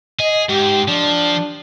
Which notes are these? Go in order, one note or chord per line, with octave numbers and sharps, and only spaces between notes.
G#4 D#5
G#2 G4
F3 D4